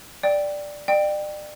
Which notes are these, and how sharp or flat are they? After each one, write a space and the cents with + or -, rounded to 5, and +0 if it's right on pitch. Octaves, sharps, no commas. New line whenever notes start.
D5 +0 G5 +0
D5 +35 G5 +0